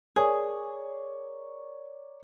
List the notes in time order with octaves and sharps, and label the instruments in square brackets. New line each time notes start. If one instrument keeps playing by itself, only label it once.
[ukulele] G#4 [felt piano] A#4 C#5 D5